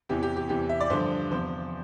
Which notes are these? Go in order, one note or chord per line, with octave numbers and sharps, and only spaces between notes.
E2 C3 E3 G4
G4
G4
E2 C3 E3 G4
E5
D5
G2 D3 F3 C5
E2 C3 F3 C5